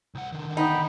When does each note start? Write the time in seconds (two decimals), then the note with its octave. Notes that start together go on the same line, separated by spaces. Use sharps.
0.15 C2 F#5
0.32 D3 D#3
0.57 B3 D#4 G5 B5